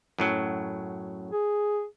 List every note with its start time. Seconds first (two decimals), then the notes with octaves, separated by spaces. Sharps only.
0.19 F#2 A2 F#3
1.31 G#4